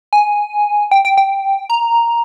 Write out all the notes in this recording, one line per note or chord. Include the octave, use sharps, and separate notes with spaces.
G#5
G5
G5
G5
A#5